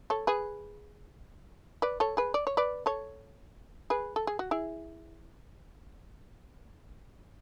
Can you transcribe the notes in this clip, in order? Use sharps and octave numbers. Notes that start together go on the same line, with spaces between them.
A4 C#5
G#4 B4
B4 D5
A4 C#5
G#4 B4
D5
C#5
B4 D5
A4 C#5
G#4 B4
A4
G#4
F#4
E4 G#4